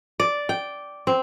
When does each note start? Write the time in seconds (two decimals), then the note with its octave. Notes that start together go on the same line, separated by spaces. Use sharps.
0.20 D5
0.49 G5
1.07 C4